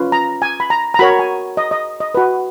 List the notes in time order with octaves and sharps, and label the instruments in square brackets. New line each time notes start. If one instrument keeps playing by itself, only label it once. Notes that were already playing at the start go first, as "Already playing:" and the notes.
Already playing: [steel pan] C#4 F4 B4
A#5
G#5
B5
A#5
A#5
F#4 A#4 C#5 B5
G#5
D#5
D#5
D#5
F#4 B4